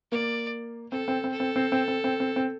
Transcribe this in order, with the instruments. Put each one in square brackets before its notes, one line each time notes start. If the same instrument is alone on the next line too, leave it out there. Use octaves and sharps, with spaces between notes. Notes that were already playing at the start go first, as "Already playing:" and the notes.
[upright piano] A#3 [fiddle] D5
[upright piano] C4 [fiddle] A4
[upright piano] C4
C4
[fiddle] A4
[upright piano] C4
C4
C4
C4
C4
C4
C4